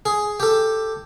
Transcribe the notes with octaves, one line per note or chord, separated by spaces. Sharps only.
G#4
G4 A4